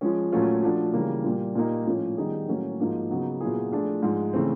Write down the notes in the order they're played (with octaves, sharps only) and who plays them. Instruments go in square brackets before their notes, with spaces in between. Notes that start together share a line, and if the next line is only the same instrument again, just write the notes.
[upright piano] F3 G#3 C#4
A#2 F#3 A3 C#4 F4
F3 A3 D4 F#4
C#3 E3 G3 A#3
A#2 G3 A#3
A#2 G3 A#3 D#4
A2 F3 A#3 C#4
D#3 G3 B3 D#4 G#4
A2 F#3 A#3 C#4
G#2 F3 A#3 D#4 F#4
C#3 F#3 B3 D#4
A#2 F#3 B3 E4 G#4
F3 A3 D4 F4 G#4
G#2 F3 G#3
C#3 E3 A3 C4